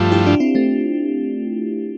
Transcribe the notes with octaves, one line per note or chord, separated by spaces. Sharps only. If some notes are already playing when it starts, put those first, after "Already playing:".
Already playing: G2 F3 A3 D4 F4
E4 G4
D4 F4
C4 E4
A3 C4